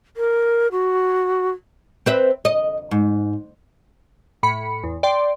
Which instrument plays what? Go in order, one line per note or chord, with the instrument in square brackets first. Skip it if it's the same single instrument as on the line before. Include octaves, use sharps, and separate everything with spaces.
[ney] A#4
F#4
[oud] C4 B4 E5
D#5
G#2
[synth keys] A2 B5 C#7
E2
D5 G5 C6